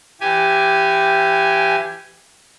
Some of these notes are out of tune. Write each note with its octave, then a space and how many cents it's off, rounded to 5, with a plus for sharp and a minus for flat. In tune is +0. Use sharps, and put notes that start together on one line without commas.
E3 +30 G4 +0 G#5 +0